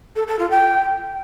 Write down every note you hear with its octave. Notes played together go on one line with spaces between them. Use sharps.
A4
A4
F4
G5